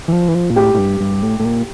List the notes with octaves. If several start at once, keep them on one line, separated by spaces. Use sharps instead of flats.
E3
F3
E3
F3
A#2
A2 G4
A2
G2
G2
A2
A2
A#2